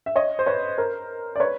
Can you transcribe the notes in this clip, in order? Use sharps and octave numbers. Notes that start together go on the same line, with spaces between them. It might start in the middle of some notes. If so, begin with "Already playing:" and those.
E5
C#5 D#5
C5
B4 C#5
A#4 C5
D5
B4 C#5